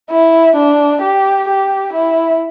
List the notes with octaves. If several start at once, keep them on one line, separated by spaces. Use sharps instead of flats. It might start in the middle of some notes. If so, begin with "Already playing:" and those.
E4
D4
G4
G4
E4